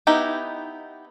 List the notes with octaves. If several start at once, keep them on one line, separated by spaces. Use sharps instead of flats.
B3 D#4 E4 G4